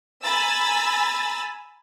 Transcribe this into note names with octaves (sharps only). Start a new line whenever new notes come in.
G#5 A#5 B5 E6 A6